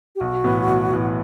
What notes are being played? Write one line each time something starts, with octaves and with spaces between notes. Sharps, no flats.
G4
B1 F#4
A2 E3 B3
B1
A2 E3 B3